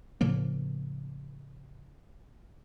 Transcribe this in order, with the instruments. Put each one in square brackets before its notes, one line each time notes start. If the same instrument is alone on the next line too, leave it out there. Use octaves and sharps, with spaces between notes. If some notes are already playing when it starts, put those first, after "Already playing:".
[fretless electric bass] A2 C#3 F3 A#3